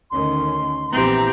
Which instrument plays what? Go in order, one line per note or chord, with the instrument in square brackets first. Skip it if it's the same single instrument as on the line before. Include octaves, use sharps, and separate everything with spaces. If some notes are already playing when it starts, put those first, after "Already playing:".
[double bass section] D2 D#3 C#4 [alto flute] C6
[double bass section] A#1 E3 B3 [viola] C4 G4 [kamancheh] A#5